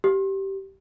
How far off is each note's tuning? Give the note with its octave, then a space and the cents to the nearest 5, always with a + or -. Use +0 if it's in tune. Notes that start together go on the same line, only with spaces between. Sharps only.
G4 -15